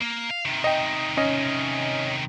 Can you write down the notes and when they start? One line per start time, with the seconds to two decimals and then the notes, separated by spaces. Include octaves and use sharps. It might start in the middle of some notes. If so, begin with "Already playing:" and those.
0.01 A#3
0.30 F5
0.45 C3 D#3
0.64 D#5 G5
1.17 C#4 D#5